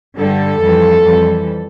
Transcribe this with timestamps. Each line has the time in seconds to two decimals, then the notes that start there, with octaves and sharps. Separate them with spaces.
0.17 G2 D3 G3 A4
0.60 F2 E3 G3
1.03 F2 E3 G3